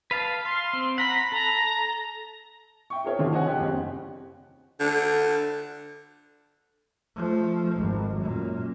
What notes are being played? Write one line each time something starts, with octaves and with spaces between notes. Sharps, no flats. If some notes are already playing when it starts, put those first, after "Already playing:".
B4 F5 A5
F5 C6
C4
F#5 A#5 B5 B6
A4 A#5
E5 G5 C#6
G#4 A#4 C#5 E5
D3 D#3 F3 C4 F#4 G#4
C#5 D#5 F#5 G#5
C2 D4 G4 F#6
F#1 G3 C4
D3
F3 A3
G#1
F#2 A#2